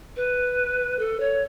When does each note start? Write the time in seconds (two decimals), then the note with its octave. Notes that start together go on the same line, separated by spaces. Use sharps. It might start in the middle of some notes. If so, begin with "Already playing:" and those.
0.16 B4
0.99 A4
1.20 C#5